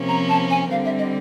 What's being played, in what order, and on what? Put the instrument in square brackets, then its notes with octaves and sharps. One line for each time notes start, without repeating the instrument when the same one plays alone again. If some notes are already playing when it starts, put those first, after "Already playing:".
Already playing: [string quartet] C3 F3 A#3 C#4
[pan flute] A#5
A5
G#5
[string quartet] D3 G3 C4 [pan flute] F5
[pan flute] E5
D#5